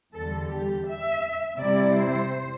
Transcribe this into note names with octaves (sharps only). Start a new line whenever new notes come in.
E2 D3 G3 A4
G4
E5
C3 G3 E4 D5
C5